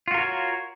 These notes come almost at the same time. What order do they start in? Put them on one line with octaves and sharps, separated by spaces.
F4 F#4 A#4 C#5